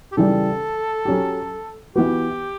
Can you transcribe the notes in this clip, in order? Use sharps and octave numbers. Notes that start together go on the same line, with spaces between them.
G4
C#3 E3 G3 A4
F#3 C#4 G4
E3 B3 F#4 G4 B4